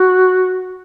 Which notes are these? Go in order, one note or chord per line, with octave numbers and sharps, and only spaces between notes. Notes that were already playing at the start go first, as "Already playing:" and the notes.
Already playing: F#4